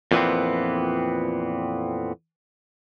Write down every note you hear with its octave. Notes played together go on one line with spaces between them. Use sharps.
F2 A#2 E3 B3 C4